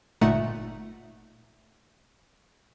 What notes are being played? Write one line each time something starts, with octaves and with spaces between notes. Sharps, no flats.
G1 A#2 A3 D#4 F#5